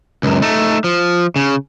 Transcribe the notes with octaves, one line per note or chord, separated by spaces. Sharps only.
C#2 F#2
A3 D#4
F3
C#3